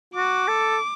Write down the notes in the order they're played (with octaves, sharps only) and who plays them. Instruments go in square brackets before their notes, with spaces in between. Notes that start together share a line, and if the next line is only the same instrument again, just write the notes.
[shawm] F#4 [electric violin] D6
[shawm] A4